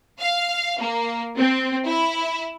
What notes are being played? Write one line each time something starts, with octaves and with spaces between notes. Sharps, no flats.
F5
A#3
C4
E4